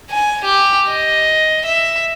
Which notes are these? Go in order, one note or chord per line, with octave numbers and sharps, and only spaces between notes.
G#5
G4
D#5
E5